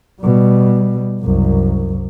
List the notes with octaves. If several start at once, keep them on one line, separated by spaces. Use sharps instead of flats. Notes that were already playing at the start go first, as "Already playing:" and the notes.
B2 G3
C2 F#2